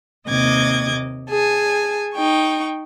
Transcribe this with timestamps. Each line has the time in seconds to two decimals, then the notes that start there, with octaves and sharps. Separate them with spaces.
0.27 D#2 C3 D#5 D6 G#6
1.29 G#4 G#5 A5
2.14 D#4 G5 C#6